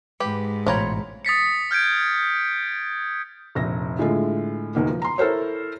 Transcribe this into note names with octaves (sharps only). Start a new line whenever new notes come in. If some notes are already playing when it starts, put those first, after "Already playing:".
G#2 G4 B4
A1 B2 F4 C5 C#5 G5 A#5 B5
D#6 A6 B6 C#7
F6 G6 G#6 D7
F1 A#1 A#6
A2 D3 G#3 A3 F4
E1 E2 D#3 A#3
F3
A#5 C6
E4 A4 A#4 C5 C#5